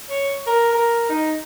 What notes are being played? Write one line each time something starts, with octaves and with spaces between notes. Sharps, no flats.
C#5
A#4
A#4
D#4